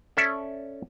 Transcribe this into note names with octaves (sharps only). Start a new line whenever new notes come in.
C#4 A4 D5 E5